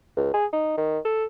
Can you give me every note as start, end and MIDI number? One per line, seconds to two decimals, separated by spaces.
0.17 0.29 37
0.34 0.46 68
0.53 0.73 63
0.77 0.99 51
1.05 1.25 69